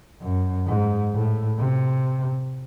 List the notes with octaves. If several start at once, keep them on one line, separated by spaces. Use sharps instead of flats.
F#2
G#2
A2
C3